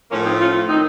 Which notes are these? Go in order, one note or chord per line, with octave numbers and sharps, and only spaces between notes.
A2 F3 A#3 C#4
C4 D#4
C#4 F4
D#3 C4 D#4